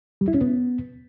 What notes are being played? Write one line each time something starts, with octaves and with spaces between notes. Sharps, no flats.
G3
E4
C#4
B3